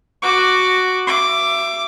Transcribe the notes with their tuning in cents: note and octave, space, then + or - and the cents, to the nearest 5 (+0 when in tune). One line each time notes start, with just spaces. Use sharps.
F#4 +0 D6 +0
E5 +30 D6 +0